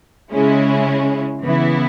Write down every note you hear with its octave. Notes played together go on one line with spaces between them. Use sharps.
C#3 G#3 C#4 E4
C#3 E3 B3 E4